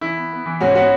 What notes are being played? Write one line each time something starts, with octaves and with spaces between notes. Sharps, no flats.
E3 E4
B3
B3
E3
G#2 C#4 F#4
B3 C#4 F#4